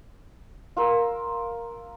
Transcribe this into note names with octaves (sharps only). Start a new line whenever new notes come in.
F4 A#4 E6